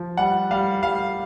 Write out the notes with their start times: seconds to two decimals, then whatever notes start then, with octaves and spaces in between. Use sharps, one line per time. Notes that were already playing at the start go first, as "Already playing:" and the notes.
Already playing: F3
0.17 G3 F#5
0.51 G3 F5
0.83 G3 F5